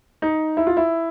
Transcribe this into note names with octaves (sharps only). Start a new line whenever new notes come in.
D#4
E4
F4
E4